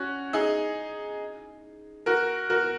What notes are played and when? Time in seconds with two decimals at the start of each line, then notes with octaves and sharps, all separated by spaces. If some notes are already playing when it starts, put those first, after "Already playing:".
Already playing: C#4 F#4
0.33 D#4 G#4
2.06 F#4 A#4
2.50 F#4 A#4